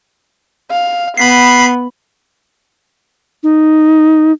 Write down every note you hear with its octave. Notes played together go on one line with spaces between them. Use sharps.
F5
B3 B5 B6 C7
D#4